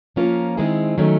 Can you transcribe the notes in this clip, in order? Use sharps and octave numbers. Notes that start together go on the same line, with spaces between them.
F3 A#3 C#4 F4 A#4
D#3 G#3 C4 E4 G#4
D#3 F#3 A3 C#4